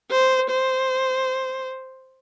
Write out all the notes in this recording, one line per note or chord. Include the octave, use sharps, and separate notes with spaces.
C5
C5